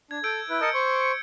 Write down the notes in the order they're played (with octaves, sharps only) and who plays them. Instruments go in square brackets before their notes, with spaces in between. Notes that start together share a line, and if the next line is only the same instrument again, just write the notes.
[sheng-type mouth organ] D4 [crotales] G#6
[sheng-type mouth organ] A4 [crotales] E6 G6 D7
[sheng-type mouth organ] E4 B4
[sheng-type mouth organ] A#4 D#5 A5 [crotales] E6 C#7
[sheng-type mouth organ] C5 C#6